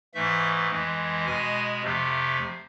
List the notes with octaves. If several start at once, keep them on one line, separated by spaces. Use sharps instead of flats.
G#2 E3 A3 E5
F2 E3 G#3
B2 G#3 G#5
F2 C3 F3 A3